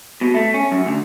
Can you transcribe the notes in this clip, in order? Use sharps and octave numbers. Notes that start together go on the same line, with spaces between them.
B2
A3
C#4
F#2
D2